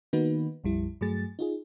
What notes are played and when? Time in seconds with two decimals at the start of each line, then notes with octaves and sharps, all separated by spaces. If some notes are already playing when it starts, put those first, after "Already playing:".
0.13 D#3 A#3 B3 D#4 F#4 B4
0.64 A#1 F2 G3 E4
1.01 G2 F#3 A3 G#4 A6
1.39 D#4 F4 G#4